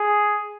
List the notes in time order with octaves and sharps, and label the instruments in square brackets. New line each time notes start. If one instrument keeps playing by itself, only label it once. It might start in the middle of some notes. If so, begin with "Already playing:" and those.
Already playing: [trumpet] G#4